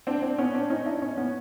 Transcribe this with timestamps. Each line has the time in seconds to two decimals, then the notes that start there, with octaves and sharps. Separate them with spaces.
0.07 C4 D4
0.22 C4 D4
0.38 B3 C#4
0.54 C4 D4
0.70 C#4 D#4
0.86 D4 E4
1.02 C#4 D#4
1.17 B3 C#4